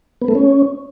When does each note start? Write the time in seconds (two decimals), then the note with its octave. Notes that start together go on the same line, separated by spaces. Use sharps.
0.22 B3
0.28 A3
0.35 C#4